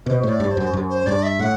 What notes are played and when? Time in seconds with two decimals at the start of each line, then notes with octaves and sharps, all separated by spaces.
0.06 B2 C5
0.20 A2 C5
0.29 D5
0.40 G2
0.51 C5
0.57 F#2
0.73 F#2
0.90 C5
1.06 G2 D5
1.23 E5
1.39 A2 F#5